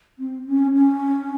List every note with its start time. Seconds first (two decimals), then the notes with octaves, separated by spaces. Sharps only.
0.19 C4
0.47 C#4
0.75 C#4